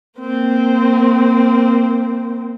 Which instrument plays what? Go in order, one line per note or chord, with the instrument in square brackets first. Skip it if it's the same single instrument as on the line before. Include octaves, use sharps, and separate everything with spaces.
[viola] A#3 C4